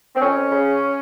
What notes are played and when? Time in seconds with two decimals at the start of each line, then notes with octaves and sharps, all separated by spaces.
0.15 C4
0.21 F2 C#4
0.51 C#3